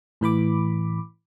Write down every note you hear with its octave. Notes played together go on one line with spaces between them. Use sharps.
A2 E3 B5 D6